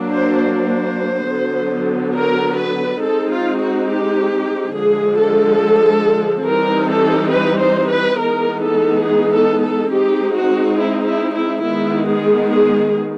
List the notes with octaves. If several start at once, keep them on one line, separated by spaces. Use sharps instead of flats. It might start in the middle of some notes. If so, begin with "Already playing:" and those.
Already playing: F#3 A#3 D4
C5
C5
D3 F#3 B3
A#4
B4
G#3 C4 D#4 A4
F4
F#4
G4
D3 F3 G#3 G#4
A4
E3 G3 C4 D#4 A#4
A4
B4
C5
B4
E3 G#3 B3 D#4 A#4
A4
G#4
A4
A4
G#3 C4 D#4 G4
F#4
E4
E4
E4
D#3 G#3 B3 E4
G#4
G#4